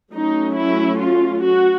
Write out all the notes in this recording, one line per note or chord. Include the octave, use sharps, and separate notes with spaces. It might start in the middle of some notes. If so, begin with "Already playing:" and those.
F#3 A3 C#4 D#4
E4
F4
F#4